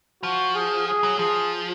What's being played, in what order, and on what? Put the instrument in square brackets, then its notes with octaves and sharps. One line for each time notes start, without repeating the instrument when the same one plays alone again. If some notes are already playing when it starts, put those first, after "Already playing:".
[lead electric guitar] F3 [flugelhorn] F#4
[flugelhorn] G#4
G#4
[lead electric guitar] F#3
[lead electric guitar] F3 [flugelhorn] G#4